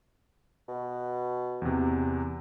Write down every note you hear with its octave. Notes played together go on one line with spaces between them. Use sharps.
B2
E2 C3